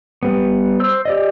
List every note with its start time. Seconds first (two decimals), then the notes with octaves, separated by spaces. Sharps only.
0.23 G3 B3
0.80 C5 E6
1.05 G4 D5 D#5